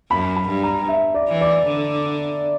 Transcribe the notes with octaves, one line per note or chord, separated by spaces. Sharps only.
F#2 B5
B5
G2
A#5
E5
D5
E3
D5
D3